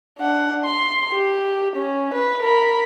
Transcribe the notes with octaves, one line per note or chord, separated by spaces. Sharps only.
D4 F#5
C6
G4
C#4
B4
A#4 B5